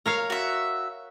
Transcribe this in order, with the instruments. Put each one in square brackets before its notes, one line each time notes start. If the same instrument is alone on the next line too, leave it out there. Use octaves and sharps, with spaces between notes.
[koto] A#4 C#5 F5
[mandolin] F#4 E5